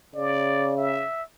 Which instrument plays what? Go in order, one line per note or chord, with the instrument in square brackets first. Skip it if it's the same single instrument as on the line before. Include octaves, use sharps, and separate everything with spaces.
[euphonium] C#3 [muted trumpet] D5
[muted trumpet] E5